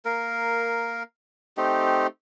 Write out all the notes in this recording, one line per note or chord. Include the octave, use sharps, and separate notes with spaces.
A#3 A#4
A3 C4 D#4 G4